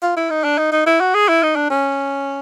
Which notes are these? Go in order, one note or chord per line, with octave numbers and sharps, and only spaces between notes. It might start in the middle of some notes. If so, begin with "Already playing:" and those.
F4
E4
D#4
D4
D#4
D#4
E4
F#4
G#4
E4
D#4
D4
C#4